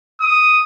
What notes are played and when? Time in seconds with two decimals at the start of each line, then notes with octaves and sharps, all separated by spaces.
0.21 D#6